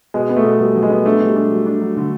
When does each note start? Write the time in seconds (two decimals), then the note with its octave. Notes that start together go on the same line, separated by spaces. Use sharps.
0.14 B2 G#3
0.29 B3
0.36 A3
0.44 B2
0.60 B2 G3
0.75 F#3
0.83 G#3
0.90 B3
1.06 A3 D4
1.15 G#3
1.20 B2 G3
1.34 G#3 D4
1.51 F#3
1.66 D4
1.81 F#3
1.96 D3